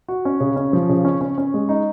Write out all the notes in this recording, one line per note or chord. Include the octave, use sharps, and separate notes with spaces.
F#4
C#4
C#3
C#4
F3
C#3
C#4
C#4
C#4
G#3
D#4